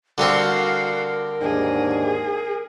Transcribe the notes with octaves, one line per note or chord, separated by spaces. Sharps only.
D3 G3 C4 F#4 A#4 F5
D#2 G#2 D4 G#4